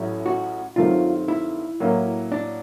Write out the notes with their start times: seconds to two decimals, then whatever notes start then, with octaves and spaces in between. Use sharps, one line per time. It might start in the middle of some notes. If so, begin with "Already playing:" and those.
Already playing: A1 A2 F#3 A3 C#4
0.26 F#4
0.76 G2 D#3 F#3 A3 C4 F4
1.28 E4
1.80 A2 F#3 A#3 C#4
2.32 D4